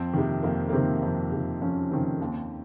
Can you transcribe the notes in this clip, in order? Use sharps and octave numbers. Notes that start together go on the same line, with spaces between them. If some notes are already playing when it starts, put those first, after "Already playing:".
Already playing: F2 C4
C3 D#3
F2 A#3
A#3
C3 D#3 C4
F2
C3 D#3
F2 C#4
C3 D#3 C4
D#2